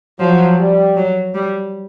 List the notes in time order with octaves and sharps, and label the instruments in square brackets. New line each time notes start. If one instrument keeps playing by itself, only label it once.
[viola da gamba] F3 [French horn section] F#3
[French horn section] G3
[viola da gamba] F#3
G3